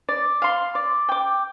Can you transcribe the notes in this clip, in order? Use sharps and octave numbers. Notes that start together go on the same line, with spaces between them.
D5
F5 C6
D5
G5 D6